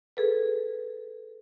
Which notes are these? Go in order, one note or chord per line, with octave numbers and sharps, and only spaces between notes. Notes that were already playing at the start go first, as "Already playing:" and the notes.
G#4 A4 B4